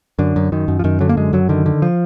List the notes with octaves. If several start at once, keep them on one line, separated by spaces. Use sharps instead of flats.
F#2 D3
F#2
F#2 D#3
F#2
F3
F#2 D#3
D3 F#3
A#3
F#2 G#3
F#2 F#3
D3 D#3
D3
F3